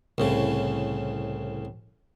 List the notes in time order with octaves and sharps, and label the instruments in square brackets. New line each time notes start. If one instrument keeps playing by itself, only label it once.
[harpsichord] C2 A2 C#3